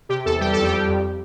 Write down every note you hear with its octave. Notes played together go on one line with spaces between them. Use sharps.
C3 G4
E2 A4
G3 G4
F2 A4
G4
G3
F2